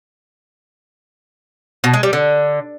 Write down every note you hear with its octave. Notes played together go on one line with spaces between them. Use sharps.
B2
G#3
G3
D3